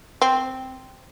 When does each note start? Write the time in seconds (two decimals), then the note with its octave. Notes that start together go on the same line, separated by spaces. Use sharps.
0.22 C4